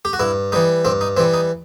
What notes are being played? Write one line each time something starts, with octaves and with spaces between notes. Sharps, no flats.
G4
F#4
G2 E4
E3 G3 D#4
G2 C4
D#4
E3 G3 C4
D#4